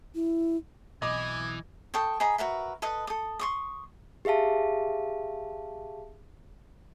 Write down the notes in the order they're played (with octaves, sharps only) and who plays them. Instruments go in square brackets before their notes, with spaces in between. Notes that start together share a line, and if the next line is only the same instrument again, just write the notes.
[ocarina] E4
[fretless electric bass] B1 B2 C4 [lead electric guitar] E3 [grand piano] D#5 D6 [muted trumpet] G#5
[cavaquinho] A4 G5 C#6 D#6
G#4 D#5 A#5 B5
F#4 A#4 B4 E5
A4 B4 D#5 D#6
A4 D#6
C6 C#6 D#6
[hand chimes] G4 G#4 E5 F5 A5